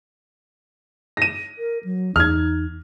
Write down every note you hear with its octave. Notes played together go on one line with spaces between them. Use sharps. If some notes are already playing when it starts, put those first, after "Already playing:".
A#6 D#7
A#4
F#3
E2 D#4 F6 G#6